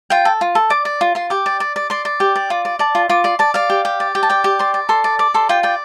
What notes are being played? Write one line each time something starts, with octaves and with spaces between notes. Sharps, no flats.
F4 G5
A4
F4
A4
D5 D6
D5
F4
F4 C6
G4 D6
D5
D5
D5
D5 C6
D5
G4
D5
F4
D5
D5 A5
F4
F4 D6
D5 C6
D5 A5
D5 F5
G4
G4
D5
G4
A5
D5 G5
G4
D5 C6
D5
A4 C6
D5
D5 D6
A4 C6
F4 G5
D5 G5